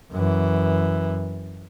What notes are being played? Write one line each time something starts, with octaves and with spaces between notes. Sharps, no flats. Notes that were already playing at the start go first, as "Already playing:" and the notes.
F#2 E3